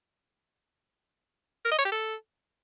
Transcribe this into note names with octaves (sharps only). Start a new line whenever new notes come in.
A#4
D#5
C#5
G4
A4